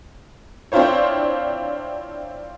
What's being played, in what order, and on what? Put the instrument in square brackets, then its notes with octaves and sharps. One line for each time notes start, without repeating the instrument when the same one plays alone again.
[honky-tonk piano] C4 D4 E4 F4 C5 C#5